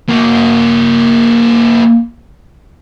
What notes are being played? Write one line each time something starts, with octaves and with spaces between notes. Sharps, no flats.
A#3 F#4